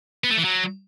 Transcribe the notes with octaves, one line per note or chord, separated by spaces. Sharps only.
B3
A3
E3
F#3